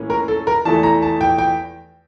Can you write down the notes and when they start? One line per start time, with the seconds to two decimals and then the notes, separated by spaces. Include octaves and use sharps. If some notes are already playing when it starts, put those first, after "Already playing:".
Already playing: A2 E3 A#3 C#4
0.10 A#4
0.28 A4
0.47 A#4
0.65 E2 E3 A3 A5
0.83 A#5
1.02 A5
1.21 G5
1.38 G5